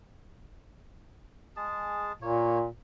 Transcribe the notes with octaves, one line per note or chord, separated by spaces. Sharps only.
G#3 G#4 A5
A#2 A#3 C#5